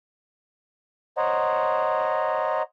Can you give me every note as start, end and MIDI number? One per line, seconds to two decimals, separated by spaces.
1.17 2.62 72
1.17 2.62 73
1.17 2.62 75
1.17 2.62 78
1.17 2.62 82